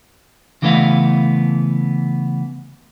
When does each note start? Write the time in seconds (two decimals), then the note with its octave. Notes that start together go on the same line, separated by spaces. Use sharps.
0.62 C#3 E3 A3 B3 E5 F5